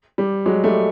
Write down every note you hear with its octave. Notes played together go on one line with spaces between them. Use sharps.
G3
F#3 G#3
G3 A3